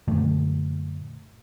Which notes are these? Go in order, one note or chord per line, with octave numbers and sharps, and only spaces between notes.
F#2 A#2 D3 A3